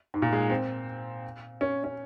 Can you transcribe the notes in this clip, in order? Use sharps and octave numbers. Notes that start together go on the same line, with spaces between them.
G#2
A#2
G#3
C4
C#4
C#4